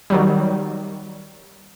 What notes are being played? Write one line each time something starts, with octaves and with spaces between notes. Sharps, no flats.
D#3 F#3 G3